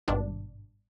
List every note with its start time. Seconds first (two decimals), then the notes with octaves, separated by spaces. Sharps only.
0.08 G#1 G2 B2 D4